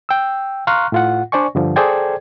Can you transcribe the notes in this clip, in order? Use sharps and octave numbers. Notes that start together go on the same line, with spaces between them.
G5 E6
F5 A#5 C6 C#6 F6 F#6
A2 F4 F#5
D4 C5 D5 G#5 C#6
G2 D3 F3
G#4 A4 C5 D5 G5 G#6